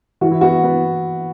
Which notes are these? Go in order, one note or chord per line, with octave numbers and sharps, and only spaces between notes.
E3 F#4
E4
B3 F#4
B3